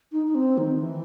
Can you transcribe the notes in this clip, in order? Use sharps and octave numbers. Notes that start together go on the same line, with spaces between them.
D#4
D#4
C4
D#3
E3